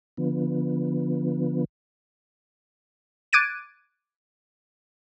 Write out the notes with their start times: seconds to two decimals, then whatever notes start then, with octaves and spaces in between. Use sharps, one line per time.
0.17 D3 F3 B3
3.33 D6 F#6 G#6 A6 D7 D#7